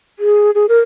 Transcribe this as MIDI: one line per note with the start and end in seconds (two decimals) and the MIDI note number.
0.19 0.51 68
0.55 0.66 68
0.69 0.80 70